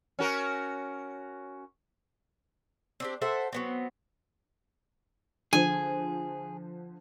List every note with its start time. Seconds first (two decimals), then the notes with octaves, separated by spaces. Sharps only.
0.19 C#4 F#4 A#4
3.00 C4 D4 G4
3.22 A4 C5 E5 F#5
3.53 F#3 B3 C4
5.53 D3 F3 G#4 G#5